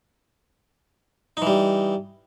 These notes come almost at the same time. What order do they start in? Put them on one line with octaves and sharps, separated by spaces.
D#4 E3 G3